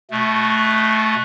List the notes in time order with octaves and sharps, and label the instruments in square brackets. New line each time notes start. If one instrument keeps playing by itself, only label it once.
[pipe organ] B2 A3